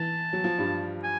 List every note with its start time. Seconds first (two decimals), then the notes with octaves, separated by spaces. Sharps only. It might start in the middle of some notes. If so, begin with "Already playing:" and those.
Already playing: E3 A5
0.33 F#3
0.44 F3
0.58 G2 G3
1.03 G#5